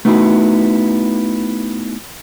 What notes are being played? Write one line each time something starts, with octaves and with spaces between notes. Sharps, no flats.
A3 B3 D#4 E4 F#4